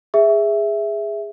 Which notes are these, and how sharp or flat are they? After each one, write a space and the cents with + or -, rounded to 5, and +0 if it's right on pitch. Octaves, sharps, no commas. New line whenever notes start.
G#4 -10 E5 +0